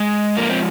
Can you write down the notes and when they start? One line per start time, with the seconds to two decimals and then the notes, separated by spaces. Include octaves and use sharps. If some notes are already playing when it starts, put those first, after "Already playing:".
Already playing: G#3
0.37 F3 A#3
0.49 C4